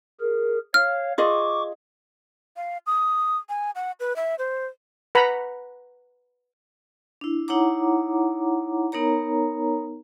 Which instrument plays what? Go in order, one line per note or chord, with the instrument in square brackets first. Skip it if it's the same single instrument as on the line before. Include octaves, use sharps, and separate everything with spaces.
[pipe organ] G#4 A#4
[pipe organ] C#5 F5 [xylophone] F6
[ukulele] F4 G#4 D#5 [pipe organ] C#6 D6
[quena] F5
D#6
G#5
F#5
B4
E5
C5
[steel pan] B4 F#5 A#5 B5
[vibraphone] D4 E4
D#4 E4 C#5 F#5 A#5 D6
B3 D#4 A#4 C#5 A#5